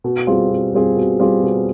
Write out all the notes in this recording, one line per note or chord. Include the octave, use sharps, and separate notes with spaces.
B2
G3 C4 F4 G#4
B2
G3 C4 F4 G#4
B2
G3 C4 F4 G#4
B2